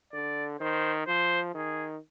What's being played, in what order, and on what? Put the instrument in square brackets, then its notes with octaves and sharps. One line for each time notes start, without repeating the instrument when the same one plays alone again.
[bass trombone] D3 [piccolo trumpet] D5
[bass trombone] D#3 [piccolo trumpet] C5
[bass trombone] F3 [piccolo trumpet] C5
[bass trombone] D#3 [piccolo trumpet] G#4